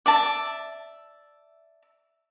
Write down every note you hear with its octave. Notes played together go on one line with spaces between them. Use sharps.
D5 E5 A5